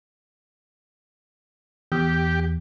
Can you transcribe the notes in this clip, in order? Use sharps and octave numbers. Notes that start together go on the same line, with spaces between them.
E2 G4